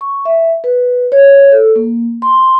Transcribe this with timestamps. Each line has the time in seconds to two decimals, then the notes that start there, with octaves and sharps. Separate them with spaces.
0.01 C#6
0.25 E5
0.64 B4
1.12 C#5
1.52 A4
1.76 A#3
2.22 C6